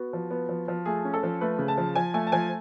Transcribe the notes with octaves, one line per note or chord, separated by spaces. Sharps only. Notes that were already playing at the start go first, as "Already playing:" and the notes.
Already playing: B3 F#4
F3
B3
F3
F3
A3 G#4
C#4
A4
F3
A3 B4
C#3
A5
F3
F3 G#5
A3 G#5
A5
F3 G#5